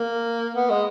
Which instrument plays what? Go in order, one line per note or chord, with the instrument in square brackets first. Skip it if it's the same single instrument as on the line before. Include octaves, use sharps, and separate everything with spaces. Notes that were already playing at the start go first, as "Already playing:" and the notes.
Already playing: [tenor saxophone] A#3
B3
G#3